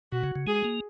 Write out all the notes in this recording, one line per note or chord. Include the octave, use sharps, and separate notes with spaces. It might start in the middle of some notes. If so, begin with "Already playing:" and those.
B2 F#4
C#3
C#3
G#3 G#4
A#3